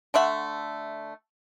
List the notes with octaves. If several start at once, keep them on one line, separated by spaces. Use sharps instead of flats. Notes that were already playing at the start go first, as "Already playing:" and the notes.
D3 A3 E5 F#5